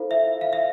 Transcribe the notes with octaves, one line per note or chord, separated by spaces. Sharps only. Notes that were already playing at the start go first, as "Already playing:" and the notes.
Already playing: E4 F4 A4 C5 F5
E5
F5
E5